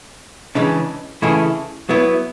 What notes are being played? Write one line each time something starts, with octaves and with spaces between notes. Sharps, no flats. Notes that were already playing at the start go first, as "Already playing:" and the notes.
C#3 E3 G#3 D4
C#3 E3 A3 E4 G#4
F#3 B3 E4